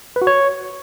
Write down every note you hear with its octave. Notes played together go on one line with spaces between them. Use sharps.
B4
F#4
C#5